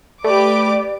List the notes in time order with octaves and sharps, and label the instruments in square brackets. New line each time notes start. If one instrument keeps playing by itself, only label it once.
[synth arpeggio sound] A3 [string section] G4 B4 D6 [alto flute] D5